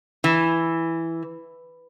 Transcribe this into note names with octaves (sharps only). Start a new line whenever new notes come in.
E3